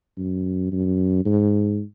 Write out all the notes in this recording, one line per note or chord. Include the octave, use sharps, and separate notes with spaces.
F#2
F#2
G#2